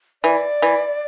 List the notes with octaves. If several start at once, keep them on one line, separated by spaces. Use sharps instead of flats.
E3 D5
E3